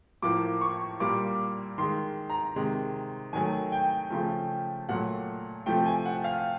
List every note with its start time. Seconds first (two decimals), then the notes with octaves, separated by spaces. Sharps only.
0.22 A2 F3 A#3 D6
0.61 C#6
1.00 A#2 G3 A#3 D6
1.78 D#3 G#3 C6
2.30 A#5
2.56 C3 D#3 G#3
3.33 D#3 F#3 A3 G#5
3.72 G5
4.10 C#3 F3 A3
4.89 A#2 F#3 A3 F#5
5.66 C3 F3 A3 G5
5.86 G#5
6.06 F#5
6.24 F5